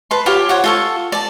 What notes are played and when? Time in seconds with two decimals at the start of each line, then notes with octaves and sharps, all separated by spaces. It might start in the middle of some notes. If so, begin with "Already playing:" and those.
0.11 B4 A5 C6
0.26 F4 G4 C#5
0.49 C5 C#5 F#5
0.64 F4 A4 C#6
1.12 D5 A5